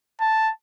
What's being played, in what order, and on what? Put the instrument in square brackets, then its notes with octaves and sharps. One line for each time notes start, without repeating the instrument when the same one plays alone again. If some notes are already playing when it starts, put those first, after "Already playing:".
[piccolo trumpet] A5